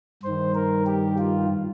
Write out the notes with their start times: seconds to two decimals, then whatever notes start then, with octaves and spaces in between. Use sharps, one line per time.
0.23 G2 D#3 C5
0.55 A#4
0.87 G4
1.18 F4